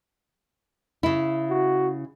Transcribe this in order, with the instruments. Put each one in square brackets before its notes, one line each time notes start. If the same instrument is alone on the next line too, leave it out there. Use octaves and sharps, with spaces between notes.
[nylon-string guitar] C#3 E4
[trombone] F#4